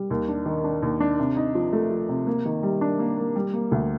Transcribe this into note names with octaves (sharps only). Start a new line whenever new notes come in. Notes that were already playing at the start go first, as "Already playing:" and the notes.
Already playing: G3
D#2
D4
D#3
D4
D#2
D4
C3
D#4
F3
A3
F3
C3
A#3
D#3
G3
D4
A#3
A#3
G3
A#3
D2